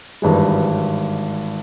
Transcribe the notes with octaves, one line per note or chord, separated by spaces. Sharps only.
G#1 G2 E3 G#3